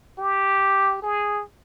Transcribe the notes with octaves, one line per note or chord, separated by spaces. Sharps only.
G4
G#4